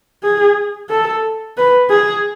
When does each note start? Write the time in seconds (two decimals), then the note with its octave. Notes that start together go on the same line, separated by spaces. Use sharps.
0.23 G#4
0.89 A4
1.57 B4
1.90 G#4